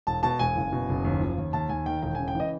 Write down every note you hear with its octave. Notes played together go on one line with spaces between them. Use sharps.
E1 A5
B2 A5
E1 G#5
F#1
B2
F#1
D#2
F3
D#2
D#2 A5
D#2 G#5
D#3 G5
E1 G5
C#3 G#5
G5
E3 D#5